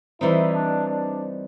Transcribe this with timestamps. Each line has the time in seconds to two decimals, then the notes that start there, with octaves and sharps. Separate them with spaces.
0.21 E3 G3 C4 D#4 E4
0.53 D4
0.88 D4